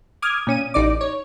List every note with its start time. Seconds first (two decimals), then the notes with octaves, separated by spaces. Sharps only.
0.22 D6 D#6 F6 G#6
0.47 A#2 C#4 D#7
0.74 A1 D#4 D5 D6
1.01 C#5